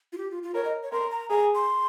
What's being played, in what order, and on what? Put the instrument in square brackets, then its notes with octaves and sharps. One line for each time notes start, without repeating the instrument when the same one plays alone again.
[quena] F4
G4
F4
F4
[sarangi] A#4 [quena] C#5
[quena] D#5
C#5
[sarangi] A#4 [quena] C6
[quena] A#5
[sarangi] G#4 [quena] A#5
[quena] C6